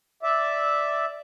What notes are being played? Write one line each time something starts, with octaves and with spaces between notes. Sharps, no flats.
D5 E5